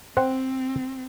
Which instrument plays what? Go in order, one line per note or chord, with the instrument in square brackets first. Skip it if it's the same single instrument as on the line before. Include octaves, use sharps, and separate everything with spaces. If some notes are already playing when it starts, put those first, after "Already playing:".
[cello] C4 [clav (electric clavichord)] C5 F#5 G5